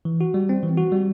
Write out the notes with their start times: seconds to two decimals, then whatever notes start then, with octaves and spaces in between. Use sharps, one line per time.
0.05 E3
0.21 F#4
0.34 G3
0.49 C4
0.63 E3
0.77 F#4
0.92 G3